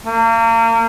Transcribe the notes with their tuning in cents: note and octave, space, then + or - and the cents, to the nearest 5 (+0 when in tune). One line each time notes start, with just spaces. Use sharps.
A#3 -35